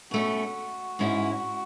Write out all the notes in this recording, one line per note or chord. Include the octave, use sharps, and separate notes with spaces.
B2 A3 C#4 F#4
G#2 G#3 C#4 E4